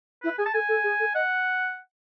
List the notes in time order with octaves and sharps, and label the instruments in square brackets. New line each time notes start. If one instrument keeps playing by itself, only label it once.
[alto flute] E4 [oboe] B4
[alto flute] G#4 [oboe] G#5
[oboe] A5
[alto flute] A4 [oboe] G#5
[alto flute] A4
G#4
A4
[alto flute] D#5 [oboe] F#5